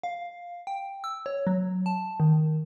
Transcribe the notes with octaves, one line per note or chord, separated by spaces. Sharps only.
F5
G5
E6
C#5
F#3
A5
D#3